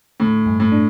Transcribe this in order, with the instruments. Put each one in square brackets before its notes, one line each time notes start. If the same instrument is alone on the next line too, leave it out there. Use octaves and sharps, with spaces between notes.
[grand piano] A2 [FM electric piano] D3
[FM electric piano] G2
[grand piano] A2
[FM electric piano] D4